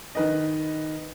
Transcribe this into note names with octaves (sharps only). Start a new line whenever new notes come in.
D#3 B4 D#5